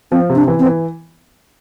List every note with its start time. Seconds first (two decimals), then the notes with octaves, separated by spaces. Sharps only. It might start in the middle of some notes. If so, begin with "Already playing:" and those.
0.12 F3 C4
0.30 C3
0.36 D4
0.48 E3
0.59 C4
0.65 E3